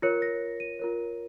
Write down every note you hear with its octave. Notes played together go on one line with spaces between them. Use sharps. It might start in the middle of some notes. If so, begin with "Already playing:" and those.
F4 A#4 C#5 C#7
A#6
D#7
F4 A#4 C#5